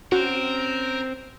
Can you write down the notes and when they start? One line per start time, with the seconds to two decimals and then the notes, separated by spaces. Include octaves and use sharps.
0.12 C4 C#4 F#4 A#4